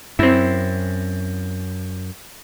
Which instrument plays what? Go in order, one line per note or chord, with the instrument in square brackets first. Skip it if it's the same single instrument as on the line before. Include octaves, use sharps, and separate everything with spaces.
[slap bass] F#2 [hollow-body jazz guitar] C4 E4